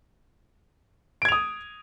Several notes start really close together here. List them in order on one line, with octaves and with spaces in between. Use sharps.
D7 G#6 F7 D#6